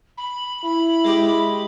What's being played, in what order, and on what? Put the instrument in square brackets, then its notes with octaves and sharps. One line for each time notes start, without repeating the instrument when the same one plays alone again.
[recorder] B5
[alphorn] E4 [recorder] B5
[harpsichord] G#3 G4